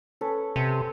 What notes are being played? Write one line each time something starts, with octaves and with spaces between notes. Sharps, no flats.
C#4 A4 B4
C3 A5